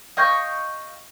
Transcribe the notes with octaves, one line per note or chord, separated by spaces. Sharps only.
D#5 F5 G5 C#6